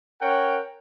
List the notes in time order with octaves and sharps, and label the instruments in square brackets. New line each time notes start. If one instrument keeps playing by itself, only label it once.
[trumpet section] C#4 A#4 C#5 F#5 G5